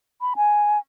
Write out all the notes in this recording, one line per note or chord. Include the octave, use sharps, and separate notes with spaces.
B5
G#5